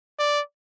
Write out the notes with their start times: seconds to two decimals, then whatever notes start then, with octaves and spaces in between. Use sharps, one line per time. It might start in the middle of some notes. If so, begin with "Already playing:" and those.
0.19 D5